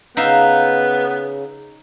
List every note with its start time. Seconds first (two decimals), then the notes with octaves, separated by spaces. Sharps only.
0.17 C#3 B3 D#4 E5 F5